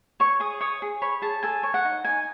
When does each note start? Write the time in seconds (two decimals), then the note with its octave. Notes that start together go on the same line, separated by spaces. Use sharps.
0.20 C#5 C#6
0.40 G#4 D#6
0.61 C#5 D#6
0.82 G#4
1.02 C#5 B5
1.22 G#4 A5
1.43 A4 G#5
1.63 C#5
1.74 F#5
1.85 D#4
2.04 D#4 G#5